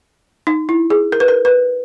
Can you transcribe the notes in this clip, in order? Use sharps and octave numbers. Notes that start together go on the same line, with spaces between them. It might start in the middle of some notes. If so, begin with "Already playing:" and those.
D#4
E4
G#4
A#4
B4
A#4
B4